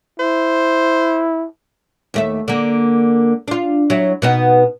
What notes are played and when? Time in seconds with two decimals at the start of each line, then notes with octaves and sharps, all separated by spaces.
0.20 E4 C5
2.14 D#2 A3 E5
2.48 D3 A#3
3.48 D4 F4
3.90 F#3 E4
4.22 B2 B3 D#4